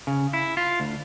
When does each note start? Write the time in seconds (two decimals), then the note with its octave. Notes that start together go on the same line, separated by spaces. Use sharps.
0.07 C#3
0.33 E4
0.57 F4
0.80 D2